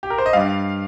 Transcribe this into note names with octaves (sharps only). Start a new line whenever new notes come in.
G4
A#4
C5
D#5
G2 G3 F5